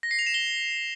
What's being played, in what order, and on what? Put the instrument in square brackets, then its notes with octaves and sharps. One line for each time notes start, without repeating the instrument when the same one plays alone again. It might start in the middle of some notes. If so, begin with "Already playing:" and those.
[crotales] A#6
C7
F7
E7
G7